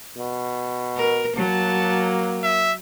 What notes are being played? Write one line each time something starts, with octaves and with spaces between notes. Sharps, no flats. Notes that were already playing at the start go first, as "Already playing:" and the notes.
B2
A#4
F#3 A#3 A5
E5